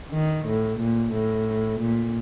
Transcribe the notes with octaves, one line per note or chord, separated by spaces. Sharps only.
D#3
A2
A#2
A2
A#2